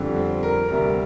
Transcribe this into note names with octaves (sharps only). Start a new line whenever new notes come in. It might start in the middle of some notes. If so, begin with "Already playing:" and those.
Already playing: F2 D3 G3
C4
A#4
D2 C3 G3 A#4